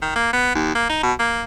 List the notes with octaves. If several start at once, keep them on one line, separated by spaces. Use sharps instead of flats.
D#3
A#3
B3
D#2
A#3
D#4
B2
A#3